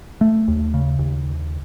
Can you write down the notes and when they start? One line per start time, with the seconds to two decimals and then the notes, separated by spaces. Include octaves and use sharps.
0.21 A3
0.48 D#2
0.74 C#3
0.99 D#2